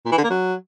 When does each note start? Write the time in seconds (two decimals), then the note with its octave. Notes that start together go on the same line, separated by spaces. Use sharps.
0.06 A#2
0.12 E3
0.18 D3
0.24 A#3
0.30 F#3